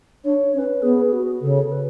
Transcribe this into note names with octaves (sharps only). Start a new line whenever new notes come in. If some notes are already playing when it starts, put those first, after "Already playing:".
D4 C#5
C#4 C#5
B4
B3 G#4
F#4
C#3 A4
B4